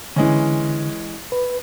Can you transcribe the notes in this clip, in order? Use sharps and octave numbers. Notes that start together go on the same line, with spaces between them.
D3 E3 G#3 C#4
B4